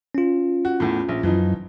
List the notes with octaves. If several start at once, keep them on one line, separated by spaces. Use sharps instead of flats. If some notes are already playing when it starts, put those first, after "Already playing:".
C#4 F4
F#4
E2 A2
A#1
F#2 E3 F3 D#4